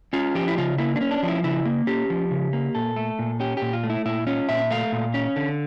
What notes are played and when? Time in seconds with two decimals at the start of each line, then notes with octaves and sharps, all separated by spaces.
0.13 C#4 F4
0.35 F3 G4
0.48 E4
0.58 C#3 F4
0.78 A#3 E4
0.96 D4
1.01 C#4
1.11 D4
1.23 F3
1.28 E4
1.43 C#3 E4
1.65 A#3
1.87 C#4 G4
2.10 F3
2.31 C#3
2.53 A#3
2.75 A#2 A4
2.96 A3
3.19 A#2
3.40 C#4 G4
3.57 A#2 G4
3.73 F4
3.83 A3
3.90 E4
4.06 A#2 E4
4.27 C#4 F4
4.49 A#2 E5
4.71 A3 F5
4.92 A#2
5.14 C#4
5.36 D3